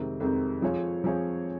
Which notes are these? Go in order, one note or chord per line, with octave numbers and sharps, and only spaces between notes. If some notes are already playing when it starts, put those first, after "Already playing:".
Already playing: F2 C3 D#3 G#3 C4
F2 C3 D#3 G#3 C4
F3 C4 F4 G#4 C#5
F3 C4 F4 G#4 C#5